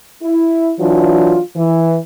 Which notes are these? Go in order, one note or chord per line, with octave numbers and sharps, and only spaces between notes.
E4
E3 F#3 D4 F4
E3